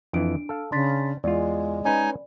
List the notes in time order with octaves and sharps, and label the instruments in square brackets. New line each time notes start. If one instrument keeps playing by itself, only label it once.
[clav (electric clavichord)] F2 E3 [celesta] D4 D7
[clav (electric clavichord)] A4 F5
[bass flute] C#3 [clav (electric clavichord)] D4 [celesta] C6 A6 B6
[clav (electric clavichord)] E2 F4 [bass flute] G#3 [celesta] D5
[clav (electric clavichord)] C#4 B4 [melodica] D#4 G#5